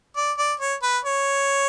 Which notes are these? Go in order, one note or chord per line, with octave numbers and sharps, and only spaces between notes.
D5
D5
C#5
B4
C#5